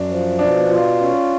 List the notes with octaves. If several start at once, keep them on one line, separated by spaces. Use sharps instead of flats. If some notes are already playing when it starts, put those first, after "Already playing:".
Already playing: F#2 D4
F3
B2 D4
F4
C#4